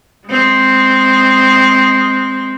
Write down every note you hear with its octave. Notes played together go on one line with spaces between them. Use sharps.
G#3 C4